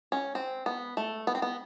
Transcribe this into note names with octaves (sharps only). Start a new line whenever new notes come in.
C#4
C4
B3
A3
B3
C4
B3